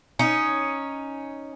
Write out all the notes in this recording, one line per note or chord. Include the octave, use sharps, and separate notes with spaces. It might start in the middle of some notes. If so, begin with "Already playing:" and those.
C#4 D#4